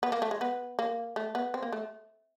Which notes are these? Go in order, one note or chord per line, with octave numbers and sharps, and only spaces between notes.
B3
A#3
A3
G#3
B3
A#3
A3
B3
C4
A#3
A3